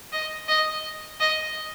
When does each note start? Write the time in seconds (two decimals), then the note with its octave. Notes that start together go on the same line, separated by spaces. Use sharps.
0.12 D#5
0.48 D#5
1.20 D#5